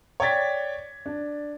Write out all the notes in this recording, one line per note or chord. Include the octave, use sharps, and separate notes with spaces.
C#5 D5 G5 G#6 A6 B6
D4